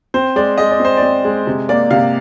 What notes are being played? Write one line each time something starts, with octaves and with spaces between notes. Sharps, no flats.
C4 C5
G#3 D5
G#3 D#5
D5
C4 C5
D5
C4
G#3
C3
A#3 D5
C3 F5